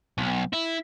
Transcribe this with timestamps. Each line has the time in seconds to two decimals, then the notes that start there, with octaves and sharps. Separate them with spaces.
0.18 B1
0.53 E4